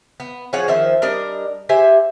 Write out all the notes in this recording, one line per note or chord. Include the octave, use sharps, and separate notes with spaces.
B3
F3 G#4 C#5 F#5
D#3 F3 C5 E5
G3 D4 A#4 D#5
G4 C5 E5 G#5